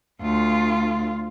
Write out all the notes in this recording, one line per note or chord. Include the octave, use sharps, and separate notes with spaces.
D2 F4